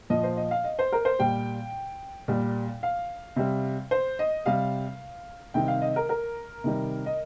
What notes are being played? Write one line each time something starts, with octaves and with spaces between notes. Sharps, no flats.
A#2 F3 D#5
C5
D#5
F5
D#5
C5
A#4
C5
A#2 G3 G5
A#2 G3
F5
C3 G3
C5
D#5
C3 G3 F5
C3 D#3 G3 G5
F5
D#5
A#4
A#4
C3 D#3 G3
D#5